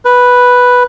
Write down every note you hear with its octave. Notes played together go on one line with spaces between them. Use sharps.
B4